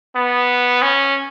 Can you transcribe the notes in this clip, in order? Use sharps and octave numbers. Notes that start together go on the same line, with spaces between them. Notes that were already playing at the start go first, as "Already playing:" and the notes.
B3
C#4